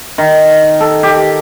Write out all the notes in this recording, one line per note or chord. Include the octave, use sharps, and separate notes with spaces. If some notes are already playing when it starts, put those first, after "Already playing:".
D#3
A4
G4